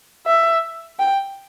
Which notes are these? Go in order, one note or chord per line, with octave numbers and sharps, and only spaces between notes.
E5
G5